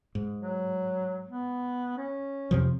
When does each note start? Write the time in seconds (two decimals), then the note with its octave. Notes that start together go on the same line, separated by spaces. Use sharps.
0.15 G#2
0.40 F#3
1.28 B3
1.97 C#4
2.51 F2 C3 F3